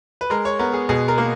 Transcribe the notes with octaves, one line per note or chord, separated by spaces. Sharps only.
B4
G#3 A#4
C#5
B3 A#4
G#4
B2 G#4
A#4
A#3